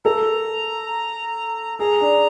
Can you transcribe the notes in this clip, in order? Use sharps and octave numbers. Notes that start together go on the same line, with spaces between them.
A4 A#5
G#4 A#5
D4